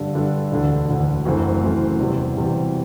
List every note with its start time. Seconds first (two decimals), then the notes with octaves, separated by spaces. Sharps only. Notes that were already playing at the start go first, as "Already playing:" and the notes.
Already playing: G2 D3 G3 D4 A4
0.14 G2 D3 G3 D4 A4
0.52 E1 D2 D3
0.88 E1 D2 D3
1.25 F#1 F#2 E3 A3 C4
1.62 F#1 F#2 E3 A3 C4
2.00 E1 E2 C3 G3 C4
2.37 E1 E2 C3 G3 C4